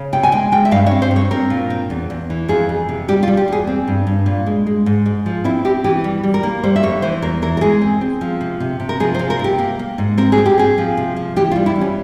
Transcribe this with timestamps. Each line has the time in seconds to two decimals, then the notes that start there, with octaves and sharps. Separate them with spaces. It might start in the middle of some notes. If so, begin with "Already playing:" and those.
Already playing: C#3
0.13 C3 G5
0.23 G#5
0.32 G#3 G5
0.52 G#3 G5
0.65 E5
0.71 G2 F5
0.86 C#5
0.91 C4
1.02 C5
1.11 G2
1.16 C#5
1.31 C4 A#4
1.50 A#2
1.70 C4
1.90 E2
2.10 E2
2.30 E3
2.49 F2 G#4
2.69 F2
2.89 C3
3.08 G3 G4
3.23 F4
3.28 G3
3.37 G4
3.48 E2 G#4
3.67 C4
3.88 G2
4.07 G2
4.26 A#2
4.46 G#3
4.67 G#3
4.86 G#2
5.06 G#3
5.26 F3
5.44 C4 E4
5.65 C4 G4
5.84 E3 G4
6.04 G3
6.24 G3
6.34 A#4
6.43 A#3
6.63 G3 C5
6.76 E5
6.83 F2 C#5
7.02 E3 C5
7.22 E2 A#4
7.42 E3 A#4
7.57 A#4
7.61 G#3 G#4
7.82 C4
8.01 C4
8.21 F3
8.41 C3
8.60 C3
8.80 C3
8.89 A#4
9.00 F3 G#4
9.15 C5
9.19 F3
9.30 A#4
9.39 C3
9.44 G4
9.59 A#3
9.79 A#3
9.98 G#2
10.18 C4 A#4
10.32 G#4
10.38 C4
10.46 G4
10.58 C4 G#4
10.78 F3
10.97 C3
11.17 F3
11.36 E3 G4
11.52 F4
11.56 G3
11.66 E4
11.76 G3
11.81 C#4